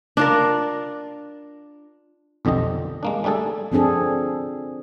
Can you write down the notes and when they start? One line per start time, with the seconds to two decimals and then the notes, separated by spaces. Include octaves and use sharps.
0.17 D4 F4 A#4
2.45 B1 F2 D3 G4 D#5
3.03 G#3 A#3 D4
3.24 G3 A3 D4 G#4 A4
3.72 F3 C4 D4 G#4 A4